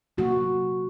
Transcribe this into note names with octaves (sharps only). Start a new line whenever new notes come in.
C3 F#3 A#3 F#4